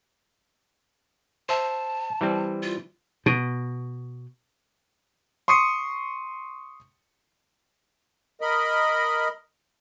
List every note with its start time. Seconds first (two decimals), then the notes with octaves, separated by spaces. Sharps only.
1.49 C5 E5 A5
2.21 E3 G3 C4
2.63 F4
3.26 B2
5.48 C6 C#6 D#6 C7 C#7
8.41 A#4 D#5 B5